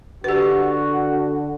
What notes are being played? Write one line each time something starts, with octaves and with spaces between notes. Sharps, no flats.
D3 F#4 G4 B4